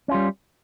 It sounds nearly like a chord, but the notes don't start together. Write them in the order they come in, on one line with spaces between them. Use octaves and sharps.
C#4 F4 G3